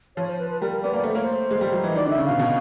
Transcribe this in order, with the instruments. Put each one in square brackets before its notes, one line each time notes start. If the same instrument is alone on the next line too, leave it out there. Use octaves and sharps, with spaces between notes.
[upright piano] F3 [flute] C#5
[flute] C5
B4
B4
[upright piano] G3 [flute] A#4
[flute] A#4
[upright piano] B3 [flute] D5
[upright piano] A#3 [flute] D5
[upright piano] A3 [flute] C5
[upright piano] A#3 [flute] C#5
[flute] C5
[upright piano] G#3
G3
F#3
[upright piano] E3 [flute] D#5
[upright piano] D#3 [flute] D5
[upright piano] D3 [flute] E5
[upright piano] C#3
[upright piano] B2 [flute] F5
[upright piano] B2